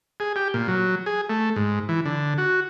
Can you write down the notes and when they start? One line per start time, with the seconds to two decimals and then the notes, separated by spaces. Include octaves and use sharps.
0.20 G#4
0.36 G4
0.54 A#2
0.68 F#3
1.06 G#4
1.30 A3
1.56 G#2
1.89 E3
2.05 D3
2.38 F#4